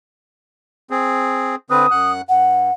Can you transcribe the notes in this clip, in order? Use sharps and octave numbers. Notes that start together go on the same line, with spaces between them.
C4 G#4
D3 C4 B4 D#6
F#2 F#5 F#6
G2 F#5